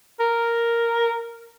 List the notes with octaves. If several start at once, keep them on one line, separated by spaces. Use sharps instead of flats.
A#4